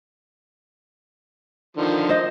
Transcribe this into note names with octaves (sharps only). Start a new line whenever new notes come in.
D3 D#3 F3
C5 D#5